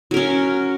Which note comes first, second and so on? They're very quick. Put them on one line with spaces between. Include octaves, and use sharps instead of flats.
F#3 A#4 C#4